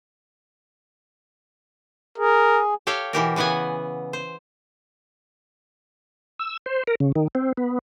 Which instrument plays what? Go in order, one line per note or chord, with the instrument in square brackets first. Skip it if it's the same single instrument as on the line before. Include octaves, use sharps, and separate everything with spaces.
[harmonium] G#4 [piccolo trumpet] A#4
[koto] G4 A4 C#5 F5 G5
B2 E3 G4 A#4
C#3 E3 B3 F#5 G#5
C5
[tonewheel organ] E6
C5
A#4
C#3
D#3
C4
B3